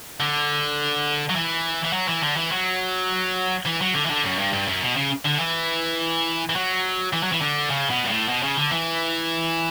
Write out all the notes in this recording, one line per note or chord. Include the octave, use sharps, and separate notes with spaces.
D3
F#3
E3
E3
F#3
E3
D3
E3
F#3
E3
F#3
D3
E3
D3
F#2
G2
G2
F#2
B2
C#3
D3
E3
E3
F#3
E3
F#3
E3
D3
C#3
B2
G2
A2
B2
C#3
D3
E3